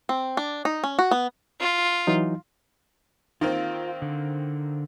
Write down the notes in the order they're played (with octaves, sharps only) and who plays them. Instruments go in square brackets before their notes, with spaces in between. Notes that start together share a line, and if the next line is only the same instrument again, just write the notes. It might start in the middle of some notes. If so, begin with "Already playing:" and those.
[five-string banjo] C4
D4
D#4
C#4
F#4
B3
[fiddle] F4
[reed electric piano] E3 F#3 D#4
[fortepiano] D#3 A#3 C4 [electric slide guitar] F4
[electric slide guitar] D3